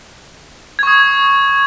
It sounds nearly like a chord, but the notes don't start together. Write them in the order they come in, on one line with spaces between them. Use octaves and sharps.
G#6 C#6 D#6